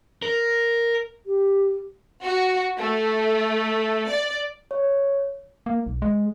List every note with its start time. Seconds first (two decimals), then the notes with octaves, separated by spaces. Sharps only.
0.22 A#4
1.26 G4
2.23 F#4
2.78 A3
4.09 D5
4.71 C#5
5.66 A#3
5.86 B1
6.02 G#3